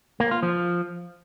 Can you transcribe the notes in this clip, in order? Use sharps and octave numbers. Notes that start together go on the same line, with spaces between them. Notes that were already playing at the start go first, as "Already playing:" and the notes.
A#3
F4
F3